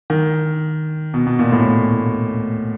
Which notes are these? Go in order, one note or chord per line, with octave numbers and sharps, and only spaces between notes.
D#3
B2
B2
A#2
A2